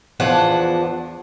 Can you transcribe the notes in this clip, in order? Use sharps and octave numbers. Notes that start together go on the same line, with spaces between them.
E2 F3 D4 F#5